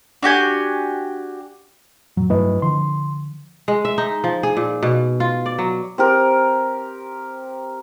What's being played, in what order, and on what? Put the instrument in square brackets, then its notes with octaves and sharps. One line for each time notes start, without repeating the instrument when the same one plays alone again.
[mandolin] D4 F#4 G4 G#5
[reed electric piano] F2 A2 [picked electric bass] F#3
[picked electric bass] G2 F#3 A3 [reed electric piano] E4 B4 D#5
[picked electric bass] D3 F3 [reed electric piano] C6
[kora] G#3
E5
D#4
F3
G#4
A#2
B2
F4
D5
F#3
[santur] C4 G4 A#4